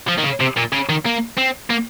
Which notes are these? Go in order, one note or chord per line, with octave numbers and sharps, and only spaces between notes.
F3
D#3
C#3
C3
A#2
C#3
D#3
A#3
C4
A#3